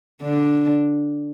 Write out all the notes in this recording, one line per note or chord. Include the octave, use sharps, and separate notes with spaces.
D3 D4